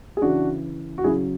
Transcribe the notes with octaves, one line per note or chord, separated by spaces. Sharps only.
G#4
C#3 E3 D4 F#4
F#4
C#3 F#3 E4 G#4